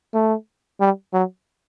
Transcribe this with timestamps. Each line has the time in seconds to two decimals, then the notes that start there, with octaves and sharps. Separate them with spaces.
0.14 A3
0.80 G3
1.13 F#3